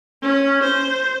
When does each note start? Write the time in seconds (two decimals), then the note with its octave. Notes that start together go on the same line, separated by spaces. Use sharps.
0.22 C#4
0.63 C5